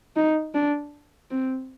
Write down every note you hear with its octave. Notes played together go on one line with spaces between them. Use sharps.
D#4
D4
C4